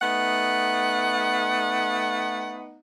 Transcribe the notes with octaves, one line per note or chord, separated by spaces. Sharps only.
A3 B3 D#4 F#5